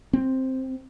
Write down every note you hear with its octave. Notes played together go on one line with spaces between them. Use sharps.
C4